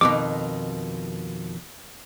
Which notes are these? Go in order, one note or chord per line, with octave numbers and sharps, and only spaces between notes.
F2 B2 D#3 D6